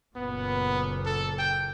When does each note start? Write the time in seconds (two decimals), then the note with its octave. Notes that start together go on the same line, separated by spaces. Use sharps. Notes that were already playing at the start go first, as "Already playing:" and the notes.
0.16 F#1 A#2 B3
1.06 A4
1.39 G5